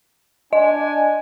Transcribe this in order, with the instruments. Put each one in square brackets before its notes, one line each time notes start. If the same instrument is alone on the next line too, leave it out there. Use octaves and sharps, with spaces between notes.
[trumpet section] D4 G#5 [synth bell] D#5